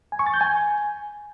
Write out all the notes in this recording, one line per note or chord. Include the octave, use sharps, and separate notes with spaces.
G#5
C#6
A6
G6
G#5